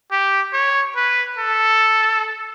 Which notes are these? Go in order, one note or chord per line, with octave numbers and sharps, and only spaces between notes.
G4
C#5
B4
A4